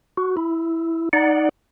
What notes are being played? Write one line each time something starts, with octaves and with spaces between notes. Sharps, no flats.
F#4
E4
D#4 D5 F#5